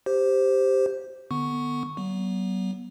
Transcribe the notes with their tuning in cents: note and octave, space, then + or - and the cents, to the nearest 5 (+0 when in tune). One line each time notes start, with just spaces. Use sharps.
G4 +0 C5 +0
D3 +30 B3 +0 C#6 -5
F#3 +40 B3 -30